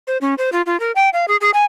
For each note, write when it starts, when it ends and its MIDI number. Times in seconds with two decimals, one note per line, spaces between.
0.07 0.17 72
0.21 0.34 61
0.38 0.50 72
0.52 0.62 65
0.66 0.79 65
0.80 0.92 70
0.96 1.09 79
1.13 1.25 77
1.28 1.37 68
1.41 1.50 68
1.54 1.65 80